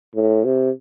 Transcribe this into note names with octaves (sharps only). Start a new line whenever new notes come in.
A2
C3